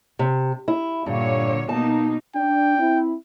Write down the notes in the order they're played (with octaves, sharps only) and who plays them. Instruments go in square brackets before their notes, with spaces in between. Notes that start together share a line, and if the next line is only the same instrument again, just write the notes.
[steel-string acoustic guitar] C3
E4
[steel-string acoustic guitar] G2 [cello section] A#2 D3 C#5
[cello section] B2 A#3 D#4 [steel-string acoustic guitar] A5
[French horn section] D4 [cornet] G5
[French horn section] C4 E4